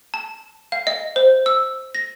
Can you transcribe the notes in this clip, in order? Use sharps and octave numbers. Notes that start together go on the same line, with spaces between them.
A5
F5
D#5
C5
E6
A#6